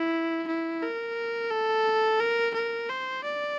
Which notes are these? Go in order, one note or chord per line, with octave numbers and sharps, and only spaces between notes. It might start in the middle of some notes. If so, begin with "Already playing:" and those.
Already playing: E4
E4
A#4
A4
A#4
A#4
C5
D5